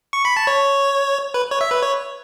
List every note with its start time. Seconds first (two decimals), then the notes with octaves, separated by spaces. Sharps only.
0.13 C#6
0.25 B5
0.37 A5
0.47 C#5
1.34 B4
1.51 C#5
1.61 E5
1.71 B4
1.83 C#5